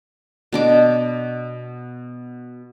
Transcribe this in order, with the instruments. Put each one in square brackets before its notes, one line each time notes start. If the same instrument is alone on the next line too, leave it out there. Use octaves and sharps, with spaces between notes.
[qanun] B2 D4 D6